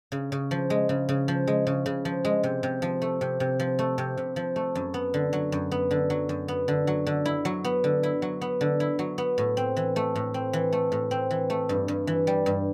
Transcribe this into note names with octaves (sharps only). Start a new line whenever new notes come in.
C#3
C#3
F3
G#3
C#3
C#3
F3
G#3
C#3
C#3
F3
G#3
C3
C3
F3
A3
C3
C3
F3
A3
C3
C3
F3
A3
F#2
B3
D3
F#3
F#2
B3
D3
F#3
F#2
B3
D3
F#3
D3
E4
F#3
B3
D3
E4
F#3
B3
D3
E4
F#3
B3
A2
C4
E3
A3
A2
C4
E3
A3
A2
C4
E3
A3
G2
G2
E3
G3
G2